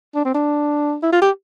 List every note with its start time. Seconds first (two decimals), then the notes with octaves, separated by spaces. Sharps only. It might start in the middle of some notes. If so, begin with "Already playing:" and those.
0.15 D4
0.25 C4
0.35 D4
1.03 E4
1.13 F4
1.22 G4